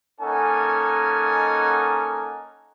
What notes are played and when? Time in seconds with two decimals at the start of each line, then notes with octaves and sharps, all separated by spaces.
0.21 A#3 C#4 D#4 A4 F#5 G#5